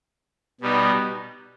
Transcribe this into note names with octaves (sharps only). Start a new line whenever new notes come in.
B2 G3 B3 D#4